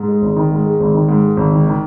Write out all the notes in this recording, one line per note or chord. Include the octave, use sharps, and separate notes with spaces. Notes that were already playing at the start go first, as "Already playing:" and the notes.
Already playing: G#2
G#3
G#1
D#3
G#2
G#3
G#1
D#3
G#2
G#3
G#1
D#3
D#3